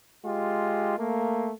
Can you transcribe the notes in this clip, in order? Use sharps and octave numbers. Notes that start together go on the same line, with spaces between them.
G#3 F4 G4
A3 A#3